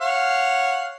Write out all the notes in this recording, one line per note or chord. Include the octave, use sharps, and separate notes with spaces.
C#5 F5 F#5